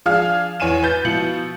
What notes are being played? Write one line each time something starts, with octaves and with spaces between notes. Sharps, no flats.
F3 D4 G#4 F5 F6
E2 C#5 G#5 D#7 E7
B4 G6 A6
B2 F3 E4 C#7 F#7